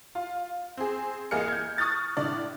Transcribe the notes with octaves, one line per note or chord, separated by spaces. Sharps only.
F4
C4 G#4
A1 A#3 G#4 D#5 F6 C#7
G6 G#6
C#6 D#6 F6 F#6 A6
A2 D3 D5